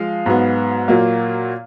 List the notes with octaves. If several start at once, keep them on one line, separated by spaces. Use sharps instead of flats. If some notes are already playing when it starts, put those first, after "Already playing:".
Already playing: F3 G#3 F5
G#2 F#3 B3
A#2 F#3 A#3